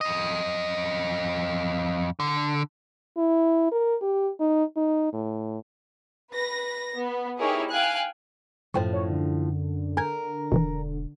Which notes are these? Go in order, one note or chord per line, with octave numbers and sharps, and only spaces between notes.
F2 D#5
D3
E4
A#4
G4
D#4
D#4
A2
B4 A#6
B3
D#4 E4 G4 G#4 A#4 C#5
F5 G5 G#5 F#6
F#2 A2 F3 C5 G5 C#6
C#5
D3
A#4 G#5 G6 G#6
E1 B2 D#3 E3